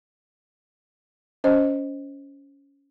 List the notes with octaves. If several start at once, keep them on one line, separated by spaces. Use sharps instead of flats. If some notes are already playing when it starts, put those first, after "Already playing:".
C#4 C5 D#5